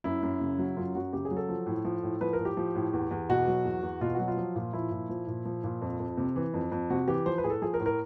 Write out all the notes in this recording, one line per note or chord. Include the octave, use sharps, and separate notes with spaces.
F#2 E4
F#2
C#3
F#3
F#2 F4
F#2 F#4
C#3 G4
G#4
F#3
A4
F3
A2
F3
A2
F3 B4
A#4
A2
G4
F3
A2
E2
E2
B2 F#4
F#3
E2
E2
B2 F4
F#3 F#4
F4
F3
A#2
F3 E4
A#2
F3
A#2
F3
A#2
F2
F2
C3
E3
F2
F2
C3 F#4
E3 G4
F3 C5
B4
A2 G#4
A4
F3 G#4
A#4
A2
A#4